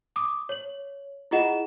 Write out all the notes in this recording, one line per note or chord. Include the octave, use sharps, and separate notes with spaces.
D6 D#6
C#5 F#7
E4 F4 G#4 D#5 F#5 E7